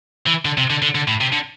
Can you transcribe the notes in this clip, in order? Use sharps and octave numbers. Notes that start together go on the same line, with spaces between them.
E3
D3
C3
D3
D3
D3
A2
C3
D3